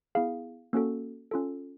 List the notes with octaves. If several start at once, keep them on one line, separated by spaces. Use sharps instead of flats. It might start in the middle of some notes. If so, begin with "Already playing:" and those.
B3 E4 G#4 F5
A#3 C#4 F#4 A4
C#4 F4 A4